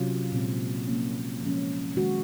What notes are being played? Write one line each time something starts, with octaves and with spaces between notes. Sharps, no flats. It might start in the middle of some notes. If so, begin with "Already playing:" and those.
Already playing: C3 F#3 C#4 F4
A#2 G#3 C4
F3 A#3 C#4
F3 G#3 C#4
D#3 G#3 C#4 F#4